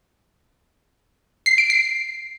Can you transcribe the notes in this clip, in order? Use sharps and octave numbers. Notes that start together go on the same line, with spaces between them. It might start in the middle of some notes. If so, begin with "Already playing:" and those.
C7
D7
C7